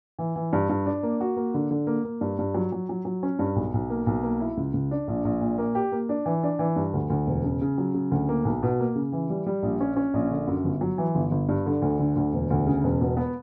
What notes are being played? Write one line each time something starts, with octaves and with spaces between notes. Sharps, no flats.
E3
E3
G2
G2
D4
A#3
F#4
A#3
D3
D3
A#3
A#3
G2
G2
F#3
F#3
F#3
F#3
C#4
G2
B1
B1
A#3
B1
A#3
E4
C#2
C#2
D4
A#1
A#1
A#2
A#3
G4
A#3
D4
E3
D4
E3
G2
D2
D2
E1
C#3
C#3
F#3
C#3
D2
A#3
B1
B2
A#3
C#3
E3
G3
G3
A#1
C#4
C#4
A#1
D3
F#2
G1
F#3
E3
G1
G1
G2
D3
D2
D3
D2
E1
D2
C#3
E1
B2
B3